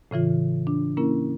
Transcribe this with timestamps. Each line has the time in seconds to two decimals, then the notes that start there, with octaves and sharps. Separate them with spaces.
0.11 A2 C#3 E3 F4
0.67 D4
0.97 A#3 C#4 E4 A#4